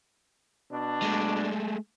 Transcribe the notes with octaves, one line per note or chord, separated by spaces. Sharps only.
B2 D4
G#3 A3